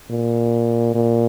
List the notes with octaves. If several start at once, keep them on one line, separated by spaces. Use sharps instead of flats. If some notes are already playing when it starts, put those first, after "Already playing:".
A#2
A#2